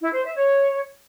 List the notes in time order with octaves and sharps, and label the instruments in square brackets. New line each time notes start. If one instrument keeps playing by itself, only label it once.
[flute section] E4
C5
E5
C#5